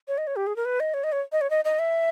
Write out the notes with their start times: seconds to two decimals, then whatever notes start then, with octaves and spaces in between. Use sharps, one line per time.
0.08 C#5
0.18 D#5
0.27 C#5
0.36 G4
0.47 G#4
0.56 A#4
0.65 B4
0.80 D#5
0.94 C#5
1.04 D#5
1.12 C#5
1.32 D#5
1.41 C#5
1.50 D#5
1.65 D#5
1.79 E5